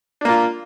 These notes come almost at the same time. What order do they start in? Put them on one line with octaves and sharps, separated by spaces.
D4 A#3 F4